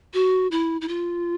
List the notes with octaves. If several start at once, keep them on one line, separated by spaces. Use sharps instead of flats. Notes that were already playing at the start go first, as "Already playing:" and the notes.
F#4
E4
E4
F4